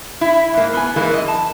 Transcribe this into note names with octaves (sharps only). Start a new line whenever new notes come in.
E4
G#2 A#3
B3 G#5
E3 G#3 A#3
F#2 D#5
A5